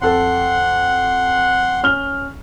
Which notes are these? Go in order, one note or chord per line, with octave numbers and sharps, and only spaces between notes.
F2 A4 F#5 C6
C#4 F6 G7